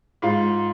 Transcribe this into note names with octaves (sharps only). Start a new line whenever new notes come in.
G#2 F4